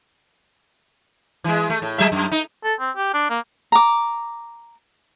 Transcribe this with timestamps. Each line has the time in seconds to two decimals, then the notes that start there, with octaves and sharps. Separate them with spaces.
1.44 E3 G#3
1.70 A3
1.82 A2
1.98 F#3 G#3 E5
2.12 F#2
2.32 D#4
2.64 A4
2.80 C4
2.96 G4
3.14 D4
3.30 A#3
3.72 A#5 D6